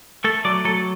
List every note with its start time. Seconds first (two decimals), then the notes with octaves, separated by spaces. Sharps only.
0.24 A3 A4
0.45 F#3 D5
0.65 F#3 A4